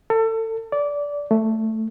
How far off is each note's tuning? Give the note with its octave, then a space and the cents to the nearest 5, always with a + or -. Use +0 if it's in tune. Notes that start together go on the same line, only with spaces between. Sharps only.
A4 +30
D5 -20
A3 +5